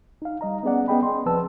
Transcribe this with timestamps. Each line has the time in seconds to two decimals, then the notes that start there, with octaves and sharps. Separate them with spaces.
0.22 D#4 F5
0.41 G3 D#5 A#5
0.63 B3 C#4 G#4 D5 F#5
0.88 B3 C#4 G#4 D#5 G5 B5
1.03 C6
1.26 C2 F3 C4 B4 A5 E6